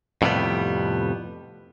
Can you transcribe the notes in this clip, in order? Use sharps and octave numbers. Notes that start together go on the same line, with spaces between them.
F2 A2 C3 G3 B3